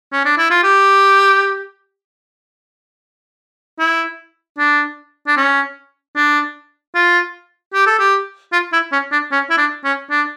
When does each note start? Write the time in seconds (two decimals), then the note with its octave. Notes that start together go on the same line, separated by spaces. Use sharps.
0.12 C#4
0.25 D4
0.38 E4
0.51 F4
0.64 G4
3.79 E4
4.58 D4
5.28 D4
5.37 C#4
6.16 D4
6.95 F4
7.74 G4
7.87 A4
7.99 G4
8.53 F4
8.73 E4
8.92 C#4
9.12 D4
9.32 C#4
9.50 E4
9.58 D4
9.84 C#4
10.10 D4